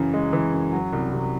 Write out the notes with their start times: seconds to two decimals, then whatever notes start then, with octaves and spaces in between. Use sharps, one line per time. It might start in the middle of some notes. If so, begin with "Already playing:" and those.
Already playing: F#2 C#3 E3
0.14 G#3
0.33 E3
0.53 F#2
0.73 F#3
0.93 C2
1.12 C3